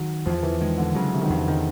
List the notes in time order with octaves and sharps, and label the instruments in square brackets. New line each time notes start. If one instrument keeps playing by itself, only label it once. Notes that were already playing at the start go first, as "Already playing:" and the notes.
Already playing: [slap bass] D#3 [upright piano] F#3
[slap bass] E2 [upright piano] F3
[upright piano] E3
[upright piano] D#3 [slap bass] G#3
[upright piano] D3
[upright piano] C#3 [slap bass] F#3
[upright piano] C3
D#3
[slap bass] E2 [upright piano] D3
[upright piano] D#3